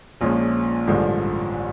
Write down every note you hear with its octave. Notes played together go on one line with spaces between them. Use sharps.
A#1 A#2 F3 G#3 C#4
A1 G2 D3 F3 G#3